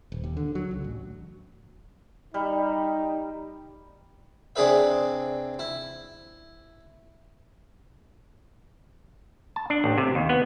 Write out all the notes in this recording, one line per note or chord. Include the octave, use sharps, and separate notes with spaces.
D#1
D#2
D3
F#3
C#2
A1
G3 D#4
C3 D4 G#4 B4 E5
E4
A5
D4
A1
C3
D#2
B3